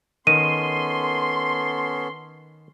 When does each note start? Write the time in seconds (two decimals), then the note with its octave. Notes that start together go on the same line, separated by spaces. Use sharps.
0.27 D#3 B3 C#4 A4 C6 D#7